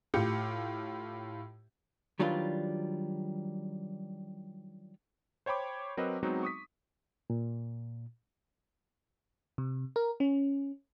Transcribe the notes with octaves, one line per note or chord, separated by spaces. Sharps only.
A2 F4 G4 D6 G6 C#7
D#3 F#3 G3 D4 F4 B4
C5 C#5 G5 B5 D6
F#3 C4 A#4 B4 D#5
F#3 G#3 B3 C4 D#4 F#4
C#6 D#6 B6
A#2
C3
A#4
C#4